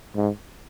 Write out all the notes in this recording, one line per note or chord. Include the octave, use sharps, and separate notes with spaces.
G#2